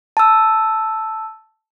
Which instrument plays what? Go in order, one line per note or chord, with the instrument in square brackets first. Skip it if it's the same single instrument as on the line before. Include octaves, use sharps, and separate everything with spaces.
[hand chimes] A5 E6